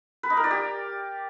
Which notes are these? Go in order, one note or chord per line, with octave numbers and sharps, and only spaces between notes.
B4
D#4
A#4
D5
G4